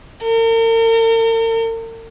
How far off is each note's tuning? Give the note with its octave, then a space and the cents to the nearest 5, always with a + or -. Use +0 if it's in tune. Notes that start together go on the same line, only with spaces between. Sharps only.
A#4 -45